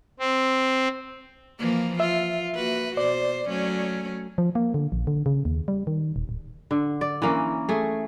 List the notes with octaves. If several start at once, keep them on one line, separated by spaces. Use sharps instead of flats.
C4
E3 F3 A#3
F4 E5
A#3 F#4 B4
B2 C5 D5
F#3 A3 C#4
F3
A#3
D3
A#1
D3
C#3
D#2
G3
D#3
D#1
D1
D3
D5
E3 A#3 C#4
A3 G#4